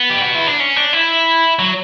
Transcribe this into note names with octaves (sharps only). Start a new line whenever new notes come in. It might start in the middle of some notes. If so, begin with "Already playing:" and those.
Already playing: B3
G4
F#4
E4
D4
C#4
D4
E4
F#3